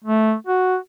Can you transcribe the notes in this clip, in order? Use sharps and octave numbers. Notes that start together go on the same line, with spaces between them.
A3
F#4